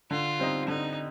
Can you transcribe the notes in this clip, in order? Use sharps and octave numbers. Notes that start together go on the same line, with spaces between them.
D3 F4
G3 C4 D#4
D3 D#4